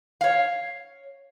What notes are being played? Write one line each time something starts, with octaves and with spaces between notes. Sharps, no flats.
C#5 F5